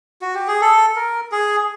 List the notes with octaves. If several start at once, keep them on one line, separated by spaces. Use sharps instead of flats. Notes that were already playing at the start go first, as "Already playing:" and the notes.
F#4
G4
G#4
A4
A#4
G#4